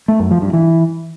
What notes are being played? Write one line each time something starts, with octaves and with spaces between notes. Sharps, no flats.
A3
F#2
F3
G2
E3